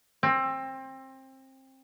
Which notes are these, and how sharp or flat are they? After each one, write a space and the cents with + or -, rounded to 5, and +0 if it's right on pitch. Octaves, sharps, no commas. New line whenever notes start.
C4 +25